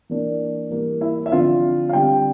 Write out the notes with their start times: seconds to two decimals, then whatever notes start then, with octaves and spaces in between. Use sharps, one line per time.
0.09 E3 A#3 D4
0.70 E3 G3 A#3
1.01 E4 E5
1.26 E5
1.32 D3 F3 C4 F4 F5
1.89 F5
1.93 D3 G3 C4 G4 G5